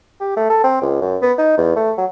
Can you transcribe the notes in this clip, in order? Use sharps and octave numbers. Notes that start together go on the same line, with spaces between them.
G4
A3
A4
C4
C#2
F#2
B3
D#4
E2
A3
F#3